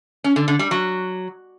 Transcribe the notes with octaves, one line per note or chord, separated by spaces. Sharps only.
C#4
D3
D3
G3
F#3